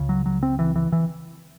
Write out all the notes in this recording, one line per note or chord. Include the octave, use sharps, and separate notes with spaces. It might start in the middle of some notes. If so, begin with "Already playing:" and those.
Already playing: C#2 C#3
F#3
F#3
C4
E3
E3
E3